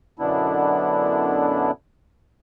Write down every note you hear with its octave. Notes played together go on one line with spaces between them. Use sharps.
F#2 B2 D3 B3 D4 E4